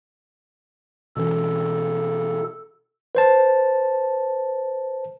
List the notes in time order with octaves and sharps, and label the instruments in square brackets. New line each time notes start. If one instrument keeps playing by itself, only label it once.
[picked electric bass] B2 E3 C#4 [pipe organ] A4
[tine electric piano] B4 C5 A5